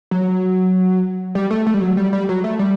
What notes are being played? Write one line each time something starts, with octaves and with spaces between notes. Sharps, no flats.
F#3
G3
A3
A3
G3
F#3
G3
G3
F#3
A3
G3